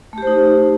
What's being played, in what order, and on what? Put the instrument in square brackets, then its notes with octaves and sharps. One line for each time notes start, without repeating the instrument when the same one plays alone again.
[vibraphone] A3
G4
C5
D#4